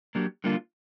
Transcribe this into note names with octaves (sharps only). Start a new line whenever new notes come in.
F#3 A#3 D4 G4
D3 G3 A#3 D4 F4